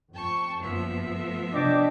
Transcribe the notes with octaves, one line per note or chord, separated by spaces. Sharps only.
F2 G5 A5 C#6
G1 F#2 F3 A#3 B3 E5
A3
C3 F#3 D4 D#5 G5 D6